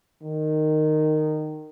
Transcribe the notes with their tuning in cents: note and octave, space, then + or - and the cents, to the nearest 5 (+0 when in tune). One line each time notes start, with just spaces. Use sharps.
D#3 -15